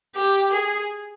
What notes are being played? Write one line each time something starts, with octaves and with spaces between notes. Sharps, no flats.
G4
G#4